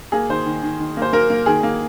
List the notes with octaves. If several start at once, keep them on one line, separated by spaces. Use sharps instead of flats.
A#3 G#4
D#3 C5
D#3
D#3
D#3
A#3 C5
A#3 A#4
A#3
D#3 G#4
A#3